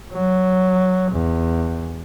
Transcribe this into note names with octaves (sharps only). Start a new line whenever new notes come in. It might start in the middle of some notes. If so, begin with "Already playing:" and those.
F#3
E2